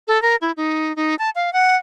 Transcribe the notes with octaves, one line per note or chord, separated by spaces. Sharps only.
A4
A#4
E4
D#4
D#4
A5
F5
F#5